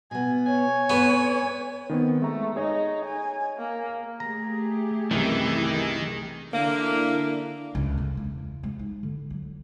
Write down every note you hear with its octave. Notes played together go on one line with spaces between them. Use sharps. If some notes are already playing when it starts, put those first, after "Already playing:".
B2 B3 G#5
C#5 G#5
B3 C4 A4 B4
D#3 B3 C4
G#3 A3 A#5
D#4 G#4 C#5 D#5
G#5
A#3
A3 G4 G#4 A#5
C2 F#2 D#3 E3
D3 A#3 D4 E4
C#2
C#3
E2
G#3
D#4
D3
F#3